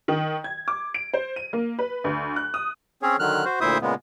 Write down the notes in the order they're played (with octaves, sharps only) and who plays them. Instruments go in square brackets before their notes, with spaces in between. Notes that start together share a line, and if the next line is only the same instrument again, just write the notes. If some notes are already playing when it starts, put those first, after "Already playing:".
[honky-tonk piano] D#3
G#6
D6
D7
C5
D#7
A#3
B4
D2
F#6
D#6
[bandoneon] C4 C#4 G#4 C#5
D3 D#3 F#3 F6 F#6
F#4 C5
D2 A#2 E4 C5 E5 D#6
A#2 C#3 G#3 B3